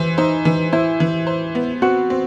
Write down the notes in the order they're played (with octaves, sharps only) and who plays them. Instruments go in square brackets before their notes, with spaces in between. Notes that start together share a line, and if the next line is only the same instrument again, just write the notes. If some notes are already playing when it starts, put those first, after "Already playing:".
Already playing: [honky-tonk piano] E3 C5
[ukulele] D#4 [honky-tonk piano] C5
[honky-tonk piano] E3
[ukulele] E4 [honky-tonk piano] C5
[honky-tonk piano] E3
C5
B3
[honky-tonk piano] C4 [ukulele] F#4
[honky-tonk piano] C4